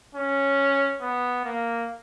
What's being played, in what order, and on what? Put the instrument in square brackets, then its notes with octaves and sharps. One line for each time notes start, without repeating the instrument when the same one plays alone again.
[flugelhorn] C#4
B3
A#3